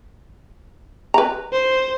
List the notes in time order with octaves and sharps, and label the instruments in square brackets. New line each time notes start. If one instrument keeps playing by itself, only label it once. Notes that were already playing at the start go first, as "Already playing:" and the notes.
[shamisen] B4 A#5
[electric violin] C5